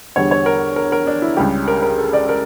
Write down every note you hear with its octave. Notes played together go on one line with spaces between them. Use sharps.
E2 D3 G3 C#5
C#5
A#4
A#4
A#4
D4
E4
C#2 C#3 G3 G4
A#4
A#4
A4
D5
A#4